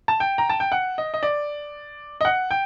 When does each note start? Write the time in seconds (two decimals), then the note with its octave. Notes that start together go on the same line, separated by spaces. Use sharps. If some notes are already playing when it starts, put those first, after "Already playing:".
0.08 A5
0.20 G5
0.38 A#5
0.50 A5
0.60 G5
0.72 F#5
0.98 D#5
1.14 D#5
1.23 D5
2.21 D#5
2.25 F#5
2.51 G5